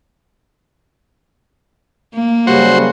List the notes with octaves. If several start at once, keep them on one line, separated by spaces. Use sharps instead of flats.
A#3
F#2 C#3 G3 F#4 C5